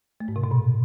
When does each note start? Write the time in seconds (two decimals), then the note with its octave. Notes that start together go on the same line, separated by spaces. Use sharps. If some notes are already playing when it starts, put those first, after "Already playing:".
0.20 A3
0.28 G#2
0.36 C3
0.44 B2
0.51 A#2